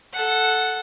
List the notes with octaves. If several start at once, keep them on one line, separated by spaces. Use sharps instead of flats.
A4 F#5